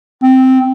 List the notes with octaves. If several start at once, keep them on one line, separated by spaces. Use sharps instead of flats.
C4